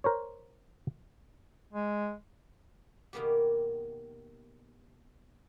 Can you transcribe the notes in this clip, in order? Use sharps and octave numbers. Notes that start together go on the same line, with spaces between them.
A#4 C5 C#5
G#3
B2 D#3 A#3 B3 G4